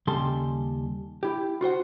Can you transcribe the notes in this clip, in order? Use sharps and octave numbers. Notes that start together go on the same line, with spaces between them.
D#2 C#3 G3 A4 C6
E4 G4
F4 F#4 C5 F#5